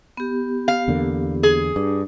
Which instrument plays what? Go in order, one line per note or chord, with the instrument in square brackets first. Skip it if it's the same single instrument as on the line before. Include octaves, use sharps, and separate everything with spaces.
[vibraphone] B3 G4
[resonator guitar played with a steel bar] F5
[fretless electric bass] E2 D3 A#3
[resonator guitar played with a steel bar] G#4
[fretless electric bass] G2 [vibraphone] D4